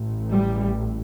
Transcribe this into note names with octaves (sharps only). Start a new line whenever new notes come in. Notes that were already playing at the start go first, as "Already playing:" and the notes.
Already playing: A1 A2
G3